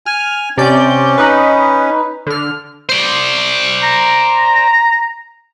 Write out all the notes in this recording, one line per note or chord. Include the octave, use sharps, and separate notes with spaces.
G#5 F6
C3 C#4 D5 G6
D#4 B4
D3 F6
C5 D5
A#5